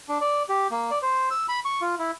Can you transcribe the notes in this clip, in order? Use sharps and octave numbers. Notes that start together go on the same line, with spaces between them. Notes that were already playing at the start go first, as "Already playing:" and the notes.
D4
D5
G4
A#3
D5
C5
E6
B5
C#6
F4
E4